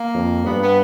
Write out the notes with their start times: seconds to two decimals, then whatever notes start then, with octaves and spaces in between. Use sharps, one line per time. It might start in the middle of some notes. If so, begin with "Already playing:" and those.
Already playing: A#3
0.14 F2
0.46 G2 B3
0.62 B3